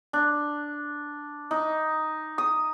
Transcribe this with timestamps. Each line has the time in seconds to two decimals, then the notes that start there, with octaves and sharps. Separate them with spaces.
0.13 D4
1.51 D#4
2.38 D#6